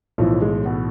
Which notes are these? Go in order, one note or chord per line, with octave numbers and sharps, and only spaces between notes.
B1 A2 E3 F3
G#3
B2 B3